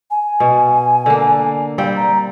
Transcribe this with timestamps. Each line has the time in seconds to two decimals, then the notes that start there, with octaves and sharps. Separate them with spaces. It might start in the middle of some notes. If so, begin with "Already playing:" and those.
0.11 G#5
0.40 B2
1.06 D3 A#3
1.78 G3 C4 F5 G5
1.96 A#5